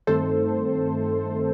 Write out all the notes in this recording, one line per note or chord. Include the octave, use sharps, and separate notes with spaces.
G2 D#3 A3 C4 A4 C5